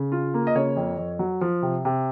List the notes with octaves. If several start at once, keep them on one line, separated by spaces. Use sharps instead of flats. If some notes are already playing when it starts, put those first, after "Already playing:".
Already playing: C#3
F4
A#3
D#5
C#3 C#5
F2
F2
F#3
F3
C3
C3